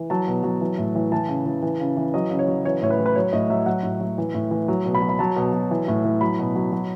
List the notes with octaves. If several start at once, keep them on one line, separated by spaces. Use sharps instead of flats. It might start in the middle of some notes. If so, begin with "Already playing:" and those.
Already playing: E3
F#3 A5
B2
F#3
E3
A2
E3
E3 A5
C#3
E3
E3
C#3
E3
F#3 D#5
C#3
C#5
F#3
E3 C#5
A2 C#5
B4
E3
B4
F#3 C#5
A2 D#5
F#3 E5
F#3 F#5
A2
F#3
E3
A2
E3
F#3
B2
B5
F#3
B5
F#3 A5
B2
F#3
E3
A2
E3
F#3 B5
B2
F#3
F#3